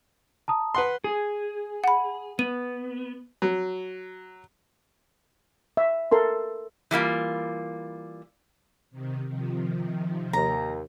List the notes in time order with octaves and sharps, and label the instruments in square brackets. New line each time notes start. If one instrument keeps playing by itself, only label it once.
[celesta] A5 A#5 D#6
[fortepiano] B4 F#5 C6
[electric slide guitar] G#4
[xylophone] F#5 B5
[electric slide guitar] B3 [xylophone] D#7
[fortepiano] F#3
[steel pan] E5
A4 A#4 C6
[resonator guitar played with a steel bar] E3 G3 A#3 F4
[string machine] C3 D#3
C3 D#3 F3
[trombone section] D#2 [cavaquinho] A#5